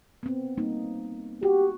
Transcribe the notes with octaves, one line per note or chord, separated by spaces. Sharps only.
B3 C4
G3 A#3 D#4
F#4 G4